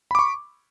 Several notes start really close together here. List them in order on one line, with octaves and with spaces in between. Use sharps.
B5 D6 C#6